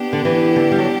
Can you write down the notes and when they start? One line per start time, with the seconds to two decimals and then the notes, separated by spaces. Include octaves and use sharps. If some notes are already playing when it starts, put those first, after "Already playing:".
Already playing: B3 D4 G4
0.13 D3
0.25 E3
0.56 D3
0.72 G3
0.78 F#3